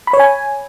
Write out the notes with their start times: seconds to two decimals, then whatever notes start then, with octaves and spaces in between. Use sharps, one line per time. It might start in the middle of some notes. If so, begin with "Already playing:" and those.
0.07 B5
0.13 C#5
0.19 G#5